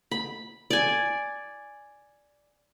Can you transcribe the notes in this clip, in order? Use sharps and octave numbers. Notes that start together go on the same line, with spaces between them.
B5
D5 G#5